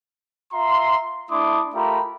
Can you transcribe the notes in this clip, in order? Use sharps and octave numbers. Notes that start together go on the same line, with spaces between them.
F4 E5 A#5 C6
A3 D4 E4 C6 D6 D#6
A3 F4 G4 A#4 A#5 B5